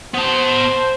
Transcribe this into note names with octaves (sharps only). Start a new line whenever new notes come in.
B3 C5 A5